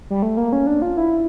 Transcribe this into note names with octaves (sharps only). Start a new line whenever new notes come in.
G3
A3
A#3
C#4
D4
F4
E4